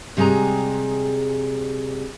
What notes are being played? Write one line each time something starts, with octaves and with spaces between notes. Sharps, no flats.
C3 G3 G#3 G#4 A#5